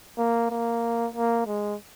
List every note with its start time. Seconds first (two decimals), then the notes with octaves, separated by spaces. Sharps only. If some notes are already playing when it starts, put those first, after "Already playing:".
0.18 A#3
0.50 A#3
1.14 A#3
1.46 G#3